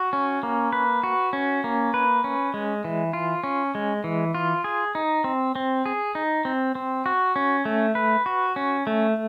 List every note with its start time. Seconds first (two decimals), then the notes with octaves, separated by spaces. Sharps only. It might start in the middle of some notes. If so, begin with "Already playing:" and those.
Already playing: F#4
0.13 C#4
0.43 A#3
0.72 B4
1.03 F#4
1.33 C#4
1.64 A#3
1.94 B4
2.24 C#4
2.54 G#3
2.84 E3
3.13 F4
3.44 C#4
3.75 G#3
4.04 E3
4.35 F4
4.64 G#4
4.95 D#4
5.24 C4
5.55 C4
5.86 G#4
6.15 D#4
6.45 C4
6.75 C4
7.06 F#4
7.36 C#4
7.65 A3
7.95 B4
8.26 F#4
8.56 C#4
8.87 A3